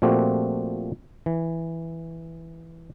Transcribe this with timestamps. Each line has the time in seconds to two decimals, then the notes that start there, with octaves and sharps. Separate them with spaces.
0.02 A#2 F3 A3 C4 F#4 G4
1.26 E3